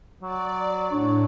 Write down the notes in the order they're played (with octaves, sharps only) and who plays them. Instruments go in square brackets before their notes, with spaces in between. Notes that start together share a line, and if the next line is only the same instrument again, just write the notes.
[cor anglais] F#3 [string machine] D5
[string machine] A2 [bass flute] D4 [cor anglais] C#5